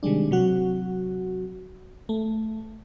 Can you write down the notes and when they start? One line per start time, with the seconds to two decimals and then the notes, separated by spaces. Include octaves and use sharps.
0.03 C3 D#3 G3 G#3 D4
0.31 C3 F#3 F#4
2.09 A3